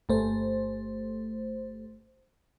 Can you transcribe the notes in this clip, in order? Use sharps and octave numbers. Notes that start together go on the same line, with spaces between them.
G1 A3 C5